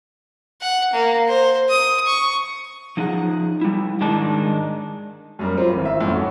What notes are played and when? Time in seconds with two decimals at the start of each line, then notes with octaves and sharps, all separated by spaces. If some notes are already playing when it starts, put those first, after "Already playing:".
0.61 F#5
0.93 A#3
1.28 C5
1.69 D#6
2.06 C#6
2.97 F3 D#4 G#4 F#5
3.61 G3 E4
4.01 G#2 D#3 G#3 D4 D#4 A5
5.39 F#2 G3 A#4
5.57 C4 F4
5.73 G#1 E3
5.85 E5
6.01 F2 G#2 G3 C#4
6.13 F#4 A4 C#5